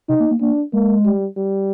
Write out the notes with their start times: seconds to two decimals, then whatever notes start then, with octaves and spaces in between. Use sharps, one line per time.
0.09 C3 D#4
0.20 A#3
0.31 A#3
0.41 A#3 D4
0.73 G#3 A#3
1.05 G3
1.37 G3